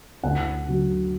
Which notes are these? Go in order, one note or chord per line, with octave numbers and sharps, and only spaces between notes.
D2 F#5
D3 F#3